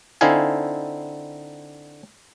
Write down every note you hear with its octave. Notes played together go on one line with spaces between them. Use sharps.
D3 C4 D#4 E4 F5 G#5